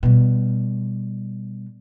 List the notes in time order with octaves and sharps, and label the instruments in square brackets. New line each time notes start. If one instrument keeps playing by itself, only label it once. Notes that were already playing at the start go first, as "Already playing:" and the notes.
[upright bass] B2 G3